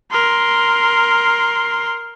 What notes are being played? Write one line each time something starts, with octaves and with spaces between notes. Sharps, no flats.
A#4 C6